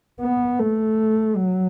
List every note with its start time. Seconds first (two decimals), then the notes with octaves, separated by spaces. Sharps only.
0.21 B3
0.59 A3
1.36 F#3